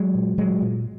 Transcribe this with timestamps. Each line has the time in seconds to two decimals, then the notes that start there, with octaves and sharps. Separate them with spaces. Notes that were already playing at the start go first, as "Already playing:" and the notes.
Already playing: F#3 G#3
0.15 A#2
0.38 A#2 F#3 G#3
0.62 A#2